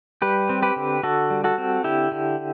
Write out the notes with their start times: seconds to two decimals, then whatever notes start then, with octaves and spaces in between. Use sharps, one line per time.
0.22 G3 G4 B4
0.49 C4
0.62 G4 B4
0.76 D3
1.03 D3 F#4 A4
1.30 G3
1.44 F#4 A4
1.58 C4
1.84 D3 E4 G4
2.12 D3